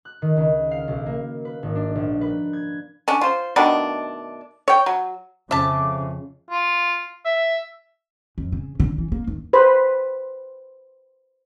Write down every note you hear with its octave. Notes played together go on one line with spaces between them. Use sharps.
F#6
D#3
C#2
F5
B1
A#3
B4
G#1
D4
A#1
B4
G#6
C#4 D4
F4 C5
B2 D#3 A3 D4
C#5 G5
F#3
F2 C#3 E5 A5 D6
F4
E5
F2
C#3
D3
E3
A#3
D#2
B4 C5 B5